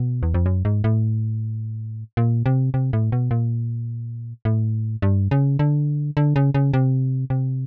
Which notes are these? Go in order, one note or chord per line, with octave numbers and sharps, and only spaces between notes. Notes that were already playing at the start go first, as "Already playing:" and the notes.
Already playing: B2
E2
F2
F#2
G#2
A2
A#2
C3
C3
A2
B2
A#2
A2
G2
C#3
D3
D3
C#3
C#3
C3
C3